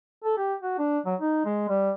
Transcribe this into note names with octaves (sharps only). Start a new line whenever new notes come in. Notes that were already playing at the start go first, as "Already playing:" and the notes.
A4
G4
F#4
D4
F#3
D#4
G#3
G3